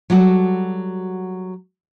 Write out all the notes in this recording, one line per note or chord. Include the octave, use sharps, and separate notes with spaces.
F#3 G3 F#4 G#4 A4